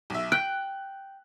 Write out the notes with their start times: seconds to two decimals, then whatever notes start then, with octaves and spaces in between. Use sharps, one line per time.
0.10 B1 E5
0.32 G5 F#6